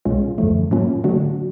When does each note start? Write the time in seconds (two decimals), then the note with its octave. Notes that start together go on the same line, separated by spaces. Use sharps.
0.05 C2 B2 G#3 C#4 F4
0.38 F#2 D3 F3 A3
0.71 A2 F#3 A#3 C#4 F4
1.04 D3 F#3 A3 D4 F#4